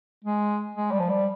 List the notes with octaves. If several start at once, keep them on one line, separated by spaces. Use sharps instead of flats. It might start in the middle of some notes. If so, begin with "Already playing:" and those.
G#3
G#3
G3
F3
G3